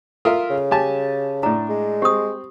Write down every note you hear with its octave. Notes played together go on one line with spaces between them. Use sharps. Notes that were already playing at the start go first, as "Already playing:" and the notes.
F4 A4 A#4 E5
C#3
G4 G#5 A5
A2 D4 A#5
G#3
C4 G4 D#6